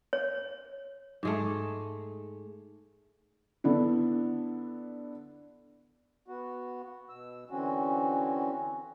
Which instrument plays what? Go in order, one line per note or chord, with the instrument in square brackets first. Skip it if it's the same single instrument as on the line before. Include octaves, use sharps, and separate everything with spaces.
[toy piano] C#5
[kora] G#2 G#3 A3
[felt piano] D3 B3 D4 E4
[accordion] B3 F#4
B2 E6
D3 E3 C4 C#4 F#4